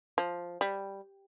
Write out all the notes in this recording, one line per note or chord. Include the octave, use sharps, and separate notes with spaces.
F3
G3